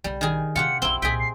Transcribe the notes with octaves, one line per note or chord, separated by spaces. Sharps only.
B1 C#3 G3
D#3 G#4
C3 C#4 F4 G4 F#5 C#7
B1 F2 C4 E4 G7
C2 A#2 G#4 D#5 G5 B6
C7